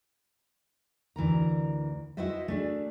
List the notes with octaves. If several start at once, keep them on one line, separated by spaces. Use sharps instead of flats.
D2 E3 A#4 A#5
E4 F#4 B4 C5 D#5 E5
A3 D4 G#4